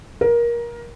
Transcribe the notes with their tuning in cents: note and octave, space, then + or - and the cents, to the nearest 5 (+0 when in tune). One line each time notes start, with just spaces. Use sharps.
A#4 +20